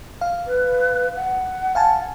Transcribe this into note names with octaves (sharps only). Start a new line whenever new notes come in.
F5
B4
F#5
F5 G#5 A5